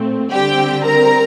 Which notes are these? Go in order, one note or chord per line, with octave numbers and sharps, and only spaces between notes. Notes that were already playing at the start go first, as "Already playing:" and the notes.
Already playing: A#2 A3 C4
D3 G3 C4 G4 G5
A#4 A#5